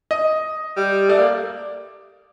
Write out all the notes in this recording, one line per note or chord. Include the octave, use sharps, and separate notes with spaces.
D#5
G3
A3 D5
A#3